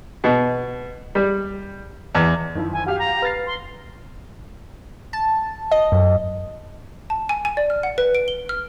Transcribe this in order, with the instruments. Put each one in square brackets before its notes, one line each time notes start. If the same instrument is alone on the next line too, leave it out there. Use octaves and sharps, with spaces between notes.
[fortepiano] B2
G3
E2
[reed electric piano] F#2 [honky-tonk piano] D#3 F3 E4
[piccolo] G#5
[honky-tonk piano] F#4 G4 F5 [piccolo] F6
[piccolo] A#5
[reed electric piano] B4 A6 [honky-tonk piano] F6 C7
[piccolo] C6
[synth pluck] A5
D#5
F#2
[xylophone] A5
G#5
G#5
D5
F6
F#5
B4
D7
G7
F6